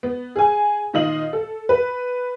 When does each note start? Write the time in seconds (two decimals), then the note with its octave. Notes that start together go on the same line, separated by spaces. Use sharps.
0.03 B3
0.36 G#4 G#5
0.93 A#2 D#3 F4 D#5 F5 F#7
1.33 A4
1.69 B4